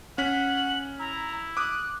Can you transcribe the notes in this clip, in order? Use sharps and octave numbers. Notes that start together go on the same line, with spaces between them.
C#4 F#5 B6 F#7
E4 A#5
D6 D#6 F#6